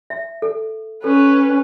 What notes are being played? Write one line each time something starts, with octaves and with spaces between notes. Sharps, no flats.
E5
A4
C#4 A4 B4